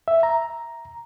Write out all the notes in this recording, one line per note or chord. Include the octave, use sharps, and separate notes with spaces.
E5
A#5